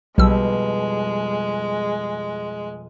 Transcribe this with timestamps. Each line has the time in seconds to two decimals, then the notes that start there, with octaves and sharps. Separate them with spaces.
0.18 B1 F2 B2 G3 G#3 E6